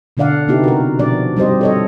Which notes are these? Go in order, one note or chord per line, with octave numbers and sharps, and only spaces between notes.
B2 D3 D4 D5 F5 F#5
C3 B3 D#4 E4 G4
F#4 A#4
B2 F3 D4 D5
G3 C4 G4 C5 D#5
A4 C#5 D#5